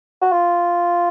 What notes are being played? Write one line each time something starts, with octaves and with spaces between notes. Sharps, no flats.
F#4
F4